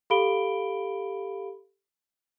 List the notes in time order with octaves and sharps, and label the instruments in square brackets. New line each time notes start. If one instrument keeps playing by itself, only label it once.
[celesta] G4 A4 F5 B5 D7 G7